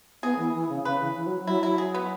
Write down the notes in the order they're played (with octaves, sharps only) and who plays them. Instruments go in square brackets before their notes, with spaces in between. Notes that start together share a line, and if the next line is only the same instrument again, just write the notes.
[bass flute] B3 [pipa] G#4
[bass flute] E3
E3
C#3
[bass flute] C#3 [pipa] B4
[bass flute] E3
E3
F#3
[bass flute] F#3 [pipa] E4
[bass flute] F#3 [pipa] E4
[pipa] G#4
B3